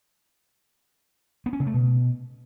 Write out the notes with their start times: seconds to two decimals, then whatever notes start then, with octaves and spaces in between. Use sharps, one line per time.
1.46 B3
1.53 C#4
1.60 C#3
1.67 A3
1.74 B2